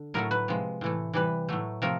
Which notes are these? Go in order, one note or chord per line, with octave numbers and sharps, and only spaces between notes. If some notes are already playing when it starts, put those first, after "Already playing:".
Already playing: D3
A2 F#3 A3 A#4
B4
C3 F3 G#3
A2 E3 A3
C3 E3 G3 B4
A2 F#3 A3
C3 F3 A3 A#4